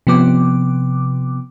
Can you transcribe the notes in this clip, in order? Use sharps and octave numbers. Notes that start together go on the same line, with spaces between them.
C3 F3 B3 D6